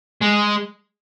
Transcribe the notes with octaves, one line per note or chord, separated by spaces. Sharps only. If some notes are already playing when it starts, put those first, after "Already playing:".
G#3